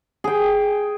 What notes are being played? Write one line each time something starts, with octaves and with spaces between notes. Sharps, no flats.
G#4 G5